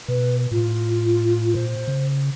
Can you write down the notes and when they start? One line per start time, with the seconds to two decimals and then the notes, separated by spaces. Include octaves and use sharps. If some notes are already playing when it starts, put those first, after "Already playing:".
0.08 B2 B4
0.51 A2 F4
1.55 A#2 C5
1.88 C#3